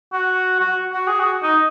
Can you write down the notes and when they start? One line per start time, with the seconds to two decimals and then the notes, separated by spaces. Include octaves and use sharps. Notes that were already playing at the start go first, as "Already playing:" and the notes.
0.13 F#4
0.60 F#4
0.92 F#4
1.07 G#4
1.19 F#4
1.43 D#4